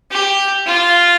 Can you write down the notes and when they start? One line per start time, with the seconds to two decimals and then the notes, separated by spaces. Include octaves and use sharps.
0.11 G4
0.66 F4